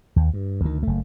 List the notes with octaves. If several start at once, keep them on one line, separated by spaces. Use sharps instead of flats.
D#2
G2
D2 D#3
F#1 A3